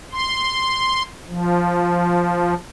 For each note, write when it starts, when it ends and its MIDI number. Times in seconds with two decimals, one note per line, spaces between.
0.12 1.03 84
1.28 2.54 53